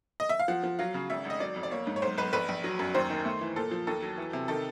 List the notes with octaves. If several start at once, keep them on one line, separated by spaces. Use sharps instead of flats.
D#5
E5
F5
F3 F#5
F3
F#3 F5
C#3
G#1 E5
G#1 D#5
F#3 D5
F2
D5
A#3 C#5
G#2
C#5
B1 C5
B1 B4
A#1 B4
A#1
F#3
F#2
D#2 C5
D#3
A3
E3
A#2 A4
F3
D#2 A4
F#3
E3
C3
D#3 A4